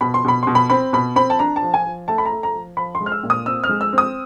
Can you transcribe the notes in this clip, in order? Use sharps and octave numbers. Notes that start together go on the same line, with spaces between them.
B2 B5
C6
B2 B5
B2 C6
B5
C4 B5
B2 B5
C4 B5
A5
D4 A#5
A5
F3
G#5
F3
A3 A5
B5
A#5
A3
A#5
F3
F3 B5
C6
G#3
F6
E6
A#2
D#6
C4 E6
F6
G#3
E6
C4 D#6